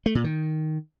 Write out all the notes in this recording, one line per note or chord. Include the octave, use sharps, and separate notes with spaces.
A3
A#2
D#3